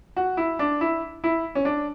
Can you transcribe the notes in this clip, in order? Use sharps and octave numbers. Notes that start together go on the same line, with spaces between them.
F#4
E4
D4
E4
E4
C#4
D4